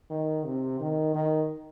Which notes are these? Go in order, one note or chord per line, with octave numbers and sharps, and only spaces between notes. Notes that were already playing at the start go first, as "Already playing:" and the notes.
D#3
C3
D#3
D#3